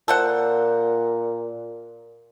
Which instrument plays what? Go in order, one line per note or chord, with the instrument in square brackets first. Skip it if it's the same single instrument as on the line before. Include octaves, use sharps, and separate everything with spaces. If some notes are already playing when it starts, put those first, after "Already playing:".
[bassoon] A#2 [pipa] A4 C5 F#5